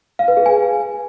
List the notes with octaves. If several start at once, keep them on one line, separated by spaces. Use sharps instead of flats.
F5
B4
G#4
G#5